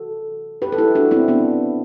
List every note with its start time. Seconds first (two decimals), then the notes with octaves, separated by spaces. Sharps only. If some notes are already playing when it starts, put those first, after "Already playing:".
Already playing: C3 E3 F#4 A4
0.62 G4 B4
0.72 A4
0.78 E4 G4
0.95 D4 F#4
1.11 C4 E4
1.28 B3 D4